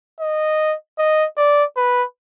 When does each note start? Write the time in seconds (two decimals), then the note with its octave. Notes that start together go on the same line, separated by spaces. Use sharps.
0.20 D#5
0.99 D#5
1.37 D5
1.77 B4